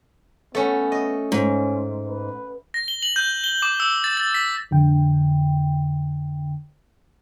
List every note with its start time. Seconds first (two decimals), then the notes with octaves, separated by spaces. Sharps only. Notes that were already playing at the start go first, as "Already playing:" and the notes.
0.55 A3 B3 C#4
0.92 D#5
1.32 G#2 C#4
2.09 B4
2.74 A#6
2.88 G7
3.03 F#7
3.16 G6
3.44 G7
3.62 D6
3.80 E6
4.04 A6
4.17 A6
4.34 B6
4.71 F2 D3 G5